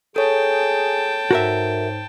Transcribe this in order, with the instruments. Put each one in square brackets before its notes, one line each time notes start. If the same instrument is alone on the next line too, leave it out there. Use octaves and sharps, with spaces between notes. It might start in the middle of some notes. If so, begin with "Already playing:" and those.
[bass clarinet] G#4 [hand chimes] A4 C#5 [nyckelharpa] G5 A5
[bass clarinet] G#2 [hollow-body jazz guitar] F#4 A#4 E5